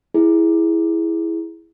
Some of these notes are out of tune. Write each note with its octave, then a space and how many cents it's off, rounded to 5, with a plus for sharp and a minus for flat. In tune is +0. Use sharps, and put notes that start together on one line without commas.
E4 +0 G#4 +0